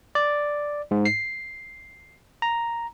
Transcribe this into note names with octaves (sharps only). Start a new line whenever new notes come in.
D5
G#2
C7
A#5